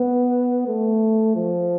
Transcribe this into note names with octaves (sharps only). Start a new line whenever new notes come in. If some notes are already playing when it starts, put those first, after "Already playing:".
Already playing: B3
A3
F3